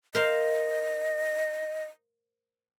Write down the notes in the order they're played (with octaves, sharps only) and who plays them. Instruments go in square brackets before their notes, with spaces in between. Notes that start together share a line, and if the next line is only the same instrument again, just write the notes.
[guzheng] A#4 C5 F5 [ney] D#5